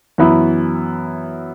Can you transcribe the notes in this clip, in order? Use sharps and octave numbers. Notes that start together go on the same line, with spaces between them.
F#2 E3 B3 E4